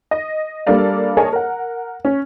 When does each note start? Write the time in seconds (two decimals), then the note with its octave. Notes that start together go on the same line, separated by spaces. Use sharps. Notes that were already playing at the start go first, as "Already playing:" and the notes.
0.11 D#5
0.67 G3 A#3 D4 A4 D5 F5
1.17 G#4 A#4 C#5 D#5 G#5 A5
1.33 A#4 F#5
2.05 C#4